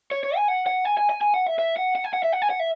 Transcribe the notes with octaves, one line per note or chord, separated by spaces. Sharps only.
C#5
C#5
G#5
F#5
F#5
G#5
G#5
G#5
G#5
F#5
E5
E5
F#5
F#5
G#5
F#5
E5
F#5
G#5
F#5
E5